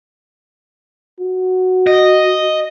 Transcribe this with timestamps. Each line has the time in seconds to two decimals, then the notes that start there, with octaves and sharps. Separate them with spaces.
1.20 F#4
1.87 D#5